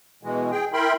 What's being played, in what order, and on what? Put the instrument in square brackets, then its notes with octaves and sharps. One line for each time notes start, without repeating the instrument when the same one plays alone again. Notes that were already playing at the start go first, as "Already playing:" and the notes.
[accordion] B2 E3 G#3
G#4 G5
E4 A#4 E5 G5 B5 C6